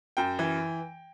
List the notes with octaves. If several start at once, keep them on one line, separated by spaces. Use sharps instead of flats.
F#2 G5
E3